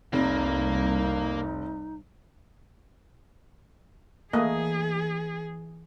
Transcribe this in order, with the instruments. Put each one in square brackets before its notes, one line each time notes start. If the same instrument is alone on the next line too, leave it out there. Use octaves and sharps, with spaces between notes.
[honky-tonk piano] F1 [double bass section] C2 [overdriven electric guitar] A#3 [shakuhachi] D#4
[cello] E3 G#4 [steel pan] A3 A#3 D#5